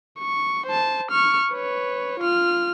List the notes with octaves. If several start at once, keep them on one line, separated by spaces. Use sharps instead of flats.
C#6
C5 A5
C#6 F6
B4 C#5
F4 F6